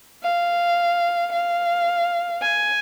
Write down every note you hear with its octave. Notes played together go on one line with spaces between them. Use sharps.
F5
F5
G#5